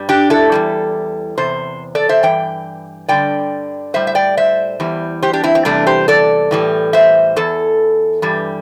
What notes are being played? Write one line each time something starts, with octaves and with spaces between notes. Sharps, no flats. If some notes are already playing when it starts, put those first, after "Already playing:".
Already playing: G2 G3
D4 G4
E4 A4
E2 C3 G3
E2 C3 C5
A4 D5
C5 E5
G2 E3 G5
G2 D3 G3 D5 G5
A2 G3 C5 E5
E5
D5 G5
C5 E5
E2 E3 G3
G4 C5
D4 G4
C4 E4
C4
E2 C3 E3 G3 A3 D4
G4 C5
A4 D5
A2 E3 G3
C5 E5
E2 E3 A4
G2 E3 G3